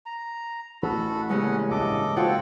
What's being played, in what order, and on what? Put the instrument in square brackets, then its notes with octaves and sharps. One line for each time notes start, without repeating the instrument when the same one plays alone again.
[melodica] A#5
[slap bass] A1 [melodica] F#4 A4 B5
[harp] A#2 C#3 G#3 [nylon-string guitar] G3 B3 [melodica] C#4 F#5
[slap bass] A1 G2 [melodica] A4 D#5 D6
[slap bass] G#2 [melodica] C4 A4 G5 [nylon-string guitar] F4 F#4 [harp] C#5 F#5